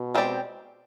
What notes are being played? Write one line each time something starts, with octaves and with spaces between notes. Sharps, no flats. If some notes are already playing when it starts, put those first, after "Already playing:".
Already playing: B2
G#3 C4 G4 D5